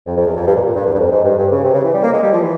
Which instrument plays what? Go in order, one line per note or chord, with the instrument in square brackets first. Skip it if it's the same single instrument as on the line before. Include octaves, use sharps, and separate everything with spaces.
[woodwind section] F2
F2
E2
F2
G2
A#2
A#2
G2
E2
G2
F2
G#2
G2
G2
C#3
C3
C#3
E3
G3
A#3
G#3
G3
F3
E3